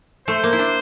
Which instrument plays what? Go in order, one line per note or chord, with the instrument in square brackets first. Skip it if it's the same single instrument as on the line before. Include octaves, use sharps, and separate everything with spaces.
[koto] A3 [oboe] C5
[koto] A#3
E4
D4